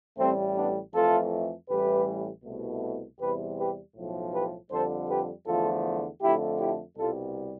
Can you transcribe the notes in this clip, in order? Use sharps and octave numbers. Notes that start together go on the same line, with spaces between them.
A1 A2 G3 A3 C4
B3 D4
F2 E3 A3 F4 A4
A1 A2 E3 G3 G4 B4
C2 B2 A3
E2 C3 G3 G4 B4
G4 B4
B1 A2 F3
G4 B4
F2 D3 G3 A4 C5
G4 B4
E2 D3 F3 A3 F4 A4
F2 D3 A3 E4 G4
E4 G4
C2 B2 G3 F4 A4